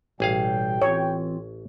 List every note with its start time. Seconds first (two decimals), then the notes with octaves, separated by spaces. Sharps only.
0.20 A1 B2 G3 G#4 F5 G5
0.82 E3 C4 F4 C#5